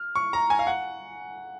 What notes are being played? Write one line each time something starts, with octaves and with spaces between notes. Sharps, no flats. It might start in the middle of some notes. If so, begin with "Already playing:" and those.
Already playing: F6
C#6
A#5
G#5
F5
F#5